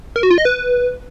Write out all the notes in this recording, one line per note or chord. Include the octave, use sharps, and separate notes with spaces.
A#4
F#4
F4
D#5
B4